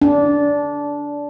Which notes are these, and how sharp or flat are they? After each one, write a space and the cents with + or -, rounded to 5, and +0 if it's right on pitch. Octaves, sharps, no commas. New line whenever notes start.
D4 -15